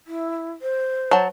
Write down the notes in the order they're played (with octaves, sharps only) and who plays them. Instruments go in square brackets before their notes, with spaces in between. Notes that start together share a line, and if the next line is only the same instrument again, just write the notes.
[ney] E4
C5
[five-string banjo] F#3 A5